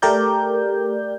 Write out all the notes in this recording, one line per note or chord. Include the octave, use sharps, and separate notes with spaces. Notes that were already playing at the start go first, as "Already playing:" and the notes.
A3 G4 A#4 D5 G6